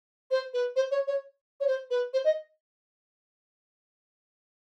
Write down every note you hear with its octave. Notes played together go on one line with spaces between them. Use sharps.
C5
B4
C5
C#5
C#5
C#5
C5
B4
C5
D#5